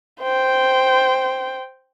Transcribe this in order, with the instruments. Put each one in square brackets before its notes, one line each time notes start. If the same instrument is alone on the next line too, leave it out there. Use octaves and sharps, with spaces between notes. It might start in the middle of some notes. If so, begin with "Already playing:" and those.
[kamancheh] C5 G5